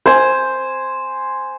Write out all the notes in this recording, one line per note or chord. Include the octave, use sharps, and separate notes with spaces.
C5 G#5